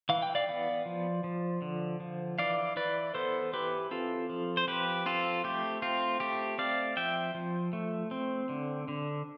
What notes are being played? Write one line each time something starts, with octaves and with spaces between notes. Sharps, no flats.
E3 F5
G5
D5 F5
B3
F3
F3
D3
F3
E3 D5 F5
E3 B4 D5
B3 A4 C5
E3 G4 B4
C4 F4 A4
F3
C5
F3 G4 B4
C4 F4 A4
A3 G4
C4 F4
A3 G4
C4 D5 F5
F3 E5 G5
F3
A3
C4
D3
D3